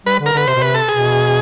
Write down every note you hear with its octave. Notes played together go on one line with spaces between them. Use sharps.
G3 B4
D3
A#4
D3 B4
C3 C5
B2
C3 B4
A4
B2 G#4